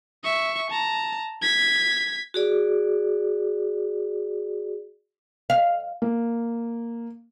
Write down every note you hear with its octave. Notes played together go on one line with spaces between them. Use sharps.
E5 C#6
A5 A#5
G#6 B6
F#4 G#4 D5
F5
A#3